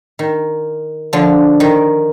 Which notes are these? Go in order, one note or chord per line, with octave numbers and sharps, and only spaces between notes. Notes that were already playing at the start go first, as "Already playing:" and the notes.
D#3
D3 F3
D#3